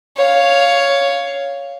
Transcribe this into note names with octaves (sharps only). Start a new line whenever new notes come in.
C#5 F5